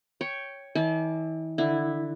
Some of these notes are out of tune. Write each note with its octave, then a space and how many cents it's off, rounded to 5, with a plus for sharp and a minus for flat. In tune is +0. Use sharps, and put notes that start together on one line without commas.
C#5 +0 G5 +0
E3 -40 D5 +0 A5 -45
D3 +15 E4 +0